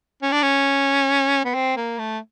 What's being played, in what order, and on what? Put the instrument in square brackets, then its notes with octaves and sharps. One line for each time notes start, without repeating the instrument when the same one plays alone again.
[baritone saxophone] C#4
D4
C#4
B3
C4
A#3
A3